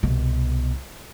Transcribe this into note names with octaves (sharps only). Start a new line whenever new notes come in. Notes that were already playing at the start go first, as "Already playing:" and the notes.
C2 B2